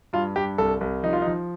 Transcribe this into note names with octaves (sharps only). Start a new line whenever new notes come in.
G2 F4
G2 G4
C2 A4
C2
F3 D#4
F4
D#4
F3